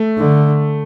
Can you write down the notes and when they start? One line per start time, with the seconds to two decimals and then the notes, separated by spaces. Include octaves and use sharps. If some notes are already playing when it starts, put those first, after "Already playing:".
Already playing: A3
0.18 D3